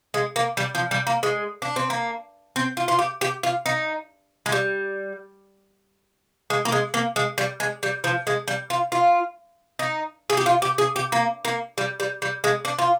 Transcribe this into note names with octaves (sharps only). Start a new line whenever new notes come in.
G#3
A#3
G3
F3
G3
A#3
G#3
D4
C4
A#3
C4
F4
F4
G4
G4
F4
D#4
G#3
G3
G#3
A#3
G#3
A#3
G#3
G3
G#3
G3
F3
G#3
G3
F4
F4
D#4
G#4
G4
F4
G4
G#4
G4
A#3
A#3
G3
G3
G3
G#3
D4
F4